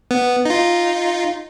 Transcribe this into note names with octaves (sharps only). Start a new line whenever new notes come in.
B3
D#4 F4